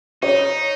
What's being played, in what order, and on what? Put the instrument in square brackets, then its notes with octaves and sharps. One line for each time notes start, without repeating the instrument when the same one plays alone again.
[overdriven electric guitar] D#4 [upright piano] C#5